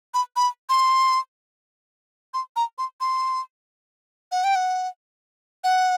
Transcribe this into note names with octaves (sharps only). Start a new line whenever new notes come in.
B5
B5
C6
C6
A#5
C6
C6
F#5
G5
F#5
F#5